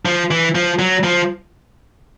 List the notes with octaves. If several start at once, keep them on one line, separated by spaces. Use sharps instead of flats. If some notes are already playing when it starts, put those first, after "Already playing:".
F3
E3
F3
F#3
F3